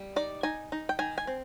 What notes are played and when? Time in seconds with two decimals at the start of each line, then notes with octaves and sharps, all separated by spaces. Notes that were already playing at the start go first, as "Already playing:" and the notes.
Already playing: G3
0.16 D#4 D5
0.43 D#4 G#5
0.72 D#4
0.89 G5
0.99 D#3 G#5
1.18 G#5
1.27 C4